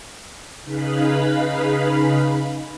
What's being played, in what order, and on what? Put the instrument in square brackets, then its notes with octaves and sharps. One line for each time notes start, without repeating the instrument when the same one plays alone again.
[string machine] C#3 D#4 G#4 B4 F5 B5